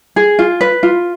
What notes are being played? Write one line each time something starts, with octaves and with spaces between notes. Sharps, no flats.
G#4
F4
B4
F4